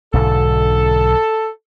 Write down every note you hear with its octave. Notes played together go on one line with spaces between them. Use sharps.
B1 G#2 D3 A4